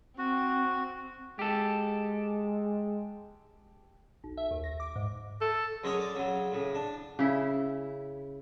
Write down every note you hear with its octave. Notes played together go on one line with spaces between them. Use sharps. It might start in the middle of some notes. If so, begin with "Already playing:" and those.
C4 F#4
G#3 G4 A4
B1
E5
D#2
A#6
D6
G#2
A4
F#2 G#3 C#4 A#4 C#5 D#5
D5
C#3 F#3
A2 C#3
D4
C#3 E4